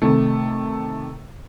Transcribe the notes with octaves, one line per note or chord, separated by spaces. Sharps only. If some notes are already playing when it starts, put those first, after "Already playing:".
C3 D#3 A3